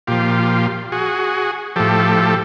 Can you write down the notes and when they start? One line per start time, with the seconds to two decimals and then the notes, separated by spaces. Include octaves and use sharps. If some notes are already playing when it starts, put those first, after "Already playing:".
0.07 A#2 F3 F4 G4
0.92 F#4 G#4
1.76 A2 F3 G4 A4